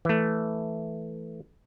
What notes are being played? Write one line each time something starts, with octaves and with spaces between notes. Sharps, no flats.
E3 A3